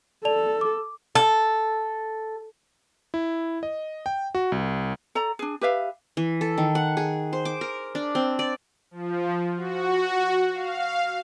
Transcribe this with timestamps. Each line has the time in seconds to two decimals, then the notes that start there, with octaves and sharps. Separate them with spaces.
0.25 A4 D5 A5 F7
0.61 D6
1.15 A4
3.14 E4
3.63 D#5
4.06 G5
4.35 F#4
4.52 C2
5.15 A4 D5 A#5
5.39 D4 G#4
5.61 G4 B4 E5 F5
6.17 E3
6.41 A4
6.58 D#3
6.75 F#5
6.97 G#4
7.33 C5
7.45 D6
7.61 A#4
7.95 D4
8.15 C4
8.39 D5
8.91 F3
9.56 F#4
10.53 F5